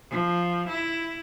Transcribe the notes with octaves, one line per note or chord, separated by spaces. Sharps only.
F3
E4